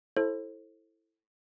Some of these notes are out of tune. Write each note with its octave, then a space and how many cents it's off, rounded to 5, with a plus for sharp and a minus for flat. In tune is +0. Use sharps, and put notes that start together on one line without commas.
E4 +0 A4 +0 C5 +25